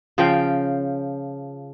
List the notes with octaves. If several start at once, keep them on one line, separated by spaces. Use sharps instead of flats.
C#3 F3 F5 G5